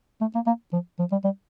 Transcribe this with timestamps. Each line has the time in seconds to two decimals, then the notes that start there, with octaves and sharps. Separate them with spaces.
0.21 A3
0.35 A#3
0.47 A#3
0.73 F3
0.99 F3
1.12 G3
1.24 G3